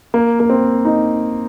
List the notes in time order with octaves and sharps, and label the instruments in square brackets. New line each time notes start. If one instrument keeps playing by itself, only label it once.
[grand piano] A#3
A#3
C4
D#4